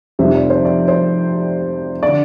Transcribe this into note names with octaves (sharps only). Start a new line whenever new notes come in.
F1 F2 C3 G3 C4 E5
D5
C5
D5
C5
D3 D5